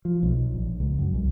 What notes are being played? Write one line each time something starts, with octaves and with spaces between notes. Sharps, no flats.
F3
B1
A#1
C#2
F#2
C2